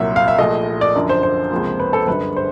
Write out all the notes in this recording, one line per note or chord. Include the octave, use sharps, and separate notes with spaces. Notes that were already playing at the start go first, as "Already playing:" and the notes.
Already playing: C2 A#2 F#3 E5
F5
E5
A#1 A#2 F3 A3 D#5
D5
F#2 D3 F3
C5
C5
C#2 C3 F3 A#3
B4
A4
G1 F#2 D3 B4
C5